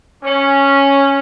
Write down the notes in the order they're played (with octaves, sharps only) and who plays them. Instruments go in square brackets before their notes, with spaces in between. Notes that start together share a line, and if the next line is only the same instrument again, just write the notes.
[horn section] C#4